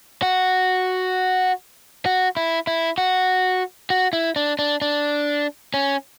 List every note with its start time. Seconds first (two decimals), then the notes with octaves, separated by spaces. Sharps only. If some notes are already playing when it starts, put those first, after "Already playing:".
0.22 F#4
2.06 F#4
2.37 E4
2.67 E4
2.98 F#4
3.90 F#4
4.13 E4
4.36 D4
4.59 D4
4.82 D4
5.74 C#4